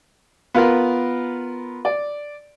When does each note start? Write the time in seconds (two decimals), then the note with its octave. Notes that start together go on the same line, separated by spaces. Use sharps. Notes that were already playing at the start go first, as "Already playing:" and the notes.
0.54 B3 F4 A#4 B5
1.85 D5